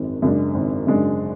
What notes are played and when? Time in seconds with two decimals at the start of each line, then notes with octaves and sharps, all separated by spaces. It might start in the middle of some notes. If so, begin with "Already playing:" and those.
Already playing: G#1 F#2 G#3
0.22 F#2 C#3 G#3 D4
0.54 G#1
0.87 F#2 C#3 G#3 D4